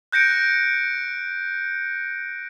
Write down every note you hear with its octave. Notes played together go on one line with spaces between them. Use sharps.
F#6 G6 A#6 C#7 D7